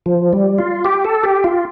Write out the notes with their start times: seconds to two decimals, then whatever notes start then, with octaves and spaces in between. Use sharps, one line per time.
0.06 F3
0.33 G3
0.58 F4
0.85 G4
1.05 A4
1.23 G4
1.44 F4